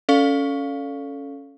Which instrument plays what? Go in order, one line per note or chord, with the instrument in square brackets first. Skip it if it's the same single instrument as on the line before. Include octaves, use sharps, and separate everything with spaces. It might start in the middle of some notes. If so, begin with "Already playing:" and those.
[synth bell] C#4 A4 D5 F5 C#6